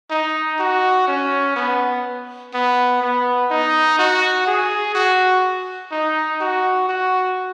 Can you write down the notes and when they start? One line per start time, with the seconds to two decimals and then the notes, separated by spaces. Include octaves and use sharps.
0.11 D#4
0.60 F#4
1.08 C#4
1.56 B3
2.54 B3
3.02 B3
3.51 D#4
3.99 F#4
4.47 G#4
4.95 F#4
5.92 D#4
6.41 F#4
6.89 F#4